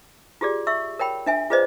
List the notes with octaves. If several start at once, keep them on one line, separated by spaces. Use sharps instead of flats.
F4 G4 G#4 D5
E5 C#6 E6
A#4 C#5 G5 B5
D4 E5 G#5
F4 G#4 B4 C5 D5 D#5